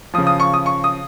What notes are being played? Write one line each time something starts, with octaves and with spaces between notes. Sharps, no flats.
C#3 F3 D#6
D#6
C#6
D#6
C#6
D#6